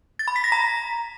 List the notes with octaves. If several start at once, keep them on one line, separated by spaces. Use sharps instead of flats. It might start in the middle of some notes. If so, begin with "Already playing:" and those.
A6
B5
B6
A#6
A#5